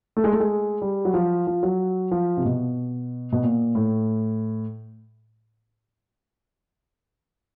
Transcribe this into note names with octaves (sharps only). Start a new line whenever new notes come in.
A3
G#3
A3
G#3
G3
F#3
F3
F3
F#3
F3
C3
B2
B2
A#2
A2